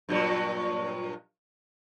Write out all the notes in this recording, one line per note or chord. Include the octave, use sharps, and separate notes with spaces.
G2 A#2 F#3